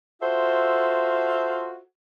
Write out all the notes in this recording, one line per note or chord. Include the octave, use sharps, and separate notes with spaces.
F4 F#4 A4 C5 E5